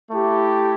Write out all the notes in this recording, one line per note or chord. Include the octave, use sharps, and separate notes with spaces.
A3 E4 G4